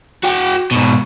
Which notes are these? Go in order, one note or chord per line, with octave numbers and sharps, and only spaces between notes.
F#4 G5
G#2 B2